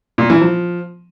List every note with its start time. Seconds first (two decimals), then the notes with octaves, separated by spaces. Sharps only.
0.18 A#2
0.30 E3
0.41 F3